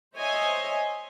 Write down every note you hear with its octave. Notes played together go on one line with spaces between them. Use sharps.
C5 C#5 D#5 E5 G#5 C6